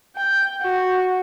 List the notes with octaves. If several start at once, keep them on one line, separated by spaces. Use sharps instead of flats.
G5
F#4